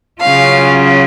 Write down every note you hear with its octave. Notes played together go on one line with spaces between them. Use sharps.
C#3 F#3 C#4 F4 F5